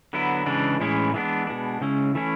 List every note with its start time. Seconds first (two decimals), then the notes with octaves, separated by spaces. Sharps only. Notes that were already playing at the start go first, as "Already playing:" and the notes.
0.13 D3 F#3 B3 E4
0.46 C#3 E3 G#3 D4
0.80 A2 E3 G#3 C#4 E4
1.14 E3 G#3 B3 D4
1.47 B2 G#3 B3 D4
1.81 C#3 G#3 C#4 E4
2.15 E3 A3 C#4 E4